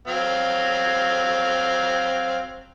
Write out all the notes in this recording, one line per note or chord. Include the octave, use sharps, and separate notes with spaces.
F#3 C4 F5